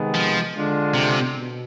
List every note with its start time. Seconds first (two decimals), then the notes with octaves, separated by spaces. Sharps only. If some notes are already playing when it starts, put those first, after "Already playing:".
Already playing: C3 D#3 G#3 B3
0.15 F3
0.55 D3 G#3 D4 F4
0.95 C3
1.35 B2